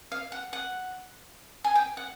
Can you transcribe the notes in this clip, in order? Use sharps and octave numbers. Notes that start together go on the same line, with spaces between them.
F5
F#5
F#5
G#5
G5
F#5